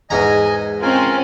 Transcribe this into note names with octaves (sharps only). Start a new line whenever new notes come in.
E2 G#2 D#5 G#5 A#5
C4 C#4 F4 A#4 G#5